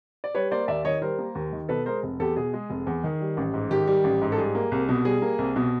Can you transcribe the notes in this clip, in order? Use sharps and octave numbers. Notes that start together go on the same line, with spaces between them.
D5
G3 B4 C#5
A#3 C5 D5
D#2 D5 E5
D#3 C#5 D#5
G3 A#4 C5
A#3
D#2
D#3
B2 A4 B4
G#3 A#4 C5
F1
E2 G4 A4
B2 G#4
G#3
F1
E2
D#3
G3
A1
G#2
D#3 G4
G3
A1
G#2
A4
G3 G#4
A#3
C2
B2
G3 G#4
A#3
C2
B2